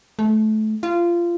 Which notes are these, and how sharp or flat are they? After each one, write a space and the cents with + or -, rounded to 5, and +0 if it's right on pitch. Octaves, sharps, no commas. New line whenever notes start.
A3 -25
F4 -20